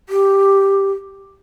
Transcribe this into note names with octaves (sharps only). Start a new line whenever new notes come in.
G4